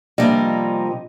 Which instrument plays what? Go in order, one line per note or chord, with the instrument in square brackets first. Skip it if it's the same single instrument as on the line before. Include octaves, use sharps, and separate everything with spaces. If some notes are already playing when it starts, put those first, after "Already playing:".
[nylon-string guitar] C3 F3 [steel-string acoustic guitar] G3 A#3 [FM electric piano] D4 D5 [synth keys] D#5